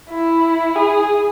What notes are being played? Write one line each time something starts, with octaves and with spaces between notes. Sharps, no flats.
E4
G#4